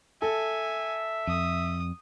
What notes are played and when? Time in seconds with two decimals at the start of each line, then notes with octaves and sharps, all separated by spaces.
0.22 A4 E5 G#5
1.27 F2 D#6